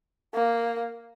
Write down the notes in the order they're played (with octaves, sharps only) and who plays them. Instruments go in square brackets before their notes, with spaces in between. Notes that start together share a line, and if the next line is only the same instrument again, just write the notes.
[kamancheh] A#3